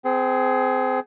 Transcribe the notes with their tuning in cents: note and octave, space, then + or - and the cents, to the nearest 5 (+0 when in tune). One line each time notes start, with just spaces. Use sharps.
C4 -25 G#4 +15